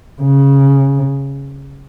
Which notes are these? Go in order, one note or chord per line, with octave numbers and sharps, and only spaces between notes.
C#3